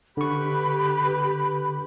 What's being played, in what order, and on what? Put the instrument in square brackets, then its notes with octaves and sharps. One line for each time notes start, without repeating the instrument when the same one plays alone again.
[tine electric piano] D3 C#6 [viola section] G4 B4 [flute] B5